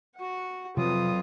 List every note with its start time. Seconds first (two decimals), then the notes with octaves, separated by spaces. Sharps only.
0.16 F#4 F#5
0.77 F2 C3 F3 F#3 F4 B4 D#6